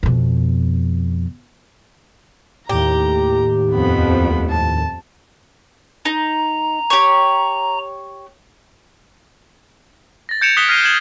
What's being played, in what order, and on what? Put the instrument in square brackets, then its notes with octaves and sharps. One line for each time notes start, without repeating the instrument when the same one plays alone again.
[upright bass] F2 B2
[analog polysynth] D#2 A2 [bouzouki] G4 [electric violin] A#5
[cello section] F2 [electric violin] B3 B5
[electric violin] A5
[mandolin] D#4 [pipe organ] A#5
[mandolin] G4 C#5
[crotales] A6 A#6
G6 G#6 C#7 D7 E7 F7
D#6 F#6 B6 C#7 E7 G7
F6 G#6 A#6 C7 D#7
G#6 C#7 E7 F#7 G7